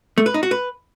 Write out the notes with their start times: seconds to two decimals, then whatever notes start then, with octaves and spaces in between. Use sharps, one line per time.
0.18 A3
0.26 B4
0.34 D#4
0.43 F#4
0.51 B4